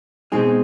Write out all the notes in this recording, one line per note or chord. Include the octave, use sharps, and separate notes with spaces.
B2 G#3 C4 D#4 G#4